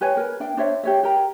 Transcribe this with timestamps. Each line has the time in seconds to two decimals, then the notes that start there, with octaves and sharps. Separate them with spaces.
0.01 G4 B4 C#5 G#5
0.17 A#4 B4
0.40 D4 E5 G5
0.57 D4 C5 C#5 E5
0.83 G4 C#5 E5
1.03 G4 A#4 G5 A#5